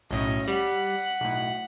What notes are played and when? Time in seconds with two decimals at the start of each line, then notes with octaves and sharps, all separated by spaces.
0.11 B1 A2 C#4 D#5
0.48 G3 F#5 B6
1.21 B1 A2